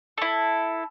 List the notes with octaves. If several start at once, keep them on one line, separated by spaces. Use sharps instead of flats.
E4 A4